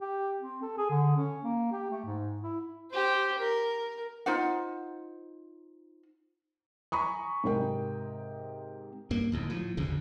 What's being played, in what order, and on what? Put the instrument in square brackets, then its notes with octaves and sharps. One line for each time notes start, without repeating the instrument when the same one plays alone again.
[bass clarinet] G4
C4
A4
G#4
D3
C#4
A#3
G4
A3
G#2
E4
[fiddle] G4 C5
A#4
[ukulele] D#4 F4 C5 F#5
[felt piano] G#5 A#5 B5 C#6 D#6
G#2 C3 A#4 G5
[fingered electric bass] G2 A#3
D1 D#2 A2
A2 F3
E1 A1 D2 C#3